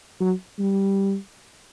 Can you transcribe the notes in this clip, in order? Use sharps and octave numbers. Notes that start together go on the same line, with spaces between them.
F#3
G3